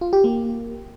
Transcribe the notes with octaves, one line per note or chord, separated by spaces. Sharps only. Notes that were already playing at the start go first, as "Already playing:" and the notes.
F4
G4
A#3